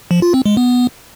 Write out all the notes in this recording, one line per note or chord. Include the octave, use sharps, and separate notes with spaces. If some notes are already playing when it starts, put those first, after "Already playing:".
F3
F4
C4
G#3
B3